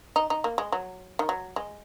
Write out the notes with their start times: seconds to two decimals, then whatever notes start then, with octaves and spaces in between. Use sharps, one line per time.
0.16 D#4
0.30 D#4
0.44 A#3
0.58 G#3
0.72 F#3
1.19 D#3
1.29 F#3
1.56 G#3